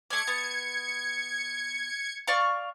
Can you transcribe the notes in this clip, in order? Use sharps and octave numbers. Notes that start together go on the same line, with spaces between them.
A3 D5 G#6 C#7
B3
D5 F5 C#6